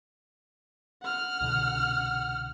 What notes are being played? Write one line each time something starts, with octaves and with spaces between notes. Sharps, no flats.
F#5 F6
C2 B2 D3